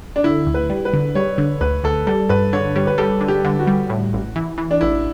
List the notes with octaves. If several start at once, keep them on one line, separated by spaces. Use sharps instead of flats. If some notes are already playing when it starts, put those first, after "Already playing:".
D4
D3 E4
D2
B4
G3
B4
D3
G3 C#5
D3
D2 B4
D2 A4
G3 A4
G2 B4
D3 C#5
G3 C#5
B4
G3 A4
D3
G4
D3
F#4
G3
A2
A1
E3
E3
D4
A1 E4